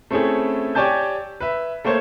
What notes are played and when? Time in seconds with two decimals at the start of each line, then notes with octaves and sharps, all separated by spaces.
0.11 A3 C4 C#4 E4 G#4 A4
0.75 G4 C#5 D5 G#5 A5 G6
1.40 B4 E5
1.84 A3 A#3 A4 C5 C#5